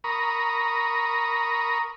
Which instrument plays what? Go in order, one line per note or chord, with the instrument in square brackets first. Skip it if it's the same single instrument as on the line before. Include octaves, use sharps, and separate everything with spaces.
[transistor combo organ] A#4 A#5 B5 C#6 D#6